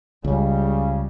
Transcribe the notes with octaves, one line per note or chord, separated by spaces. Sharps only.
C#2 C#3 G3